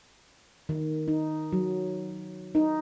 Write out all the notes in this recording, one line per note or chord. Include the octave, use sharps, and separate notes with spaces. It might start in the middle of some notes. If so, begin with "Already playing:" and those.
D#3
D#4
F#3
D#4